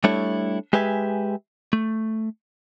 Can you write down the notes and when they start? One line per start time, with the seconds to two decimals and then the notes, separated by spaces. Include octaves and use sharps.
0.04 G3 A3 D4 E4 A4 C#5
0.73 G#3 G4 B4 E5 G#5
1.73 A3